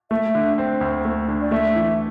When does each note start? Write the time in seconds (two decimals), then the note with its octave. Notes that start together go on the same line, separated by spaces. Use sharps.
0.11 A3 E5
0.35 D3
0.58 C4
0.81 D2
1.05 A3
1.28 D3
1.41 D5
1.51 A3 E5
1.75 E3